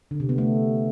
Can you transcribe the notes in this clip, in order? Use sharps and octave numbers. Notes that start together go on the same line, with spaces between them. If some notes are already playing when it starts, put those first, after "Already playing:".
D3
C3
B3
A3